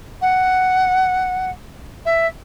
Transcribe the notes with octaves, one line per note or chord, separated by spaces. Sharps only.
F#5
E5